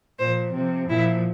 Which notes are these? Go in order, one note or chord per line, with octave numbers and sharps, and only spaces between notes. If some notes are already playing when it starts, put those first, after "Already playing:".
A#2 F3 C5
C3 F3
A#2 F3 E4